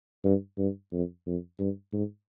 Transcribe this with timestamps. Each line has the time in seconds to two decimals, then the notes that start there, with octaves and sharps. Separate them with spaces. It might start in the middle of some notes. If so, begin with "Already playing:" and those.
0.24 G2
0.58 G2
0.93 F2
1.26 F2
1.59 G2
1.93 G#2